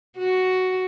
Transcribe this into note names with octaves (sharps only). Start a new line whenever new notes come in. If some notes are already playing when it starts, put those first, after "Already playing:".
F#4